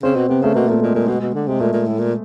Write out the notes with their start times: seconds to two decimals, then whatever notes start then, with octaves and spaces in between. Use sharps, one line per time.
0.03 C#3 C4
0.16 B2
0.29 C3 B3
0.42 C#3 A3
0.55 B2 A#3
0.69 A#2 A3
0.82 A#2 G#3
0.95 A#2 G#3
1.08 B2
1.21 B2
1.34 D3
1.47 C3 G#3
1.60 A#2 A3
1.73 A#2
1.87 A2
2.00 A#2